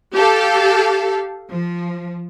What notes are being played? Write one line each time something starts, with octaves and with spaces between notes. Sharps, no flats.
G4 A4 F5
F3